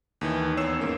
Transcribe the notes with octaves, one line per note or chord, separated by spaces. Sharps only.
D#2 D#3 E3
E2 C#5 E6 C7 E7
G#2 A#3 C#4